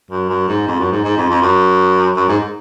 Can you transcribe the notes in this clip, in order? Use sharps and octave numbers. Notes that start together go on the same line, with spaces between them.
F#2
F#2
G#2
F2
F#2
G#2
G#2
F2
F2
F#2
F#2
G#2